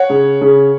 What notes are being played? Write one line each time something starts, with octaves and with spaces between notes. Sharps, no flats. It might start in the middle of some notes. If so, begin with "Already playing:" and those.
Already playing: C#5 F#5
C#3
C#3